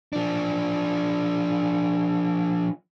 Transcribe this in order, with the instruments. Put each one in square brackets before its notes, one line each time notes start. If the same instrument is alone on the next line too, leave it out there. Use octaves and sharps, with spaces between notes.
[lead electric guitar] F3 D4